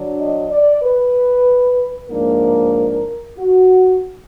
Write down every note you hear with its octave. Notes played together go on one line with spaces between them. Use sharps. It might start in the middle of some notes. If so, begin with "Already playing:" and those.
Already playing: D3 F#3 D4
D#5
D5
B4
G#2 F3 A#3 D4 A#4
F#4